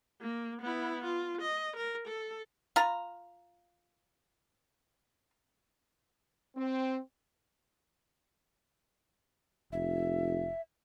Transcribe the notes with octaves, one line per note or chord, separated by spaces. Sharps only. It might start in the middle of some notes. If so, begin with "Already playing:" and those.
A#3
B3 E4
F4
D#5
A#4
A4
F4 A#5
C4
F1 E5